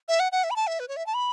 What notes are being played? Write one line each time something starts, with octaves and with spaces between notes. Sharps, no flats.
E5
F#5
F#5
E5
B5
A5
E5
B4
C#5
E5
A5
B5